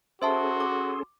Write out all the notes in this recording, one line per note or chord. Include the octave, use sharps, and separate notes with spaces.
C#4 F#4 G#4 A4 C5 E5 A5 C6
D6